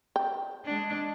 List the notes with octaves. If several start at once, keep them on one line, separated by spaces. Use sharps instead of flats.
G5
G#3 D4